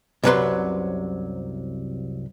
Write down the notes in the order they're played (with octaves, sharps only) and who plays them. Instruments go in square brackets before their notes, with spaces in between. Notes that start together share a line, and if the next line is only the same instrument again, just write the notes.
[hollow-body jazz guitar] C2 F#2 C3 F#3 B4 C6